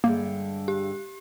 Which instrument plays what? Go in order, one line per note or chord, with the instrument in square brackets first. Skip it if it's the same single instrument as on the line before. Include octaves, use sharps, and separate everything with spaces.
[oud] G2 D3 G#3 [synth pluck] A#3
[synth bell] G4